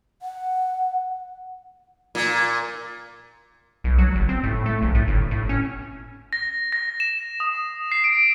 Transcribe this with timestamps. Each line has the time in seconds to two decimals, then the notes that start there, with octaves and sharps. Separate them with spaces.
0.22 F#5
2.15 A#2
3.84 B1
3.98 F#3
4.15 G1
4.29 C4
4.43 A2
4.66 A3
4.82 A#1
4.95 A2
5.08 G1
5.31 A2
5.49 C#4
6.33 A#6
6.72 A#6
7.00 E7
7.40 D#6
7.92 C7
8.04 D7